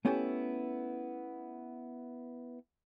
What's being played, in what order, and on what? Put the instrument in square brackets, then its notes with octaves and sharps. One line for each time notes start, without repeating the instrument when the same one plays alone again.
[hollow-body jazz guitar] A3 B3 C#4 E4 G4 A4